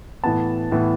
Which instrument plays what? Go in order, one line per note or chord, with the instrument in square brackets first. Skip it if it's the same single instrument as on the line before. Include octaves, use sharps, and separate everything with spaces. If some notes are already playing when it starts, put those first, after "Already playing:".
[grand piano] A2 E3 B3 A5
A2 E3 B3